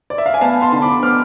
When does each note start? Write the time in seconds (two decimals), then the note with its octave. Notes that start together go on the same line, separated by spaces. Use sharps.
0.10 D5
0.18 E5
0.26 F5
0.34 G#5
0.41 B3 F5 A5
0.62 A5 C6
0.72 D3
0.82 B5 D6
1.03 B3 D6 F6